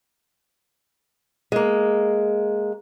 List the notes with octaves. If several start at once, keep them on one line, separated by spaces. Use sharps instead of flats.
G#3 A#3